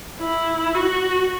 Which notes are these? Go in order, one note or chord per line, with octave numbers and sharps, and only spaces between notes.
E4
F#4